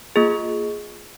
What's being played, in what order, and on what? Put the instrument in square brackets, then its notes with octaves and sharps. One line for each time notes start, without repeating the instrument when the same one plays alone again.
[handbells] A#3 F4 G#4